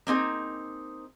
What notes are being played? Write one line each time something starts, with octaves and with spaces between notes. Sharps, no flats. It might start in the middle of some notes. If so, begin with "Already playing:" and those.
A#3 C4 D#4 G#4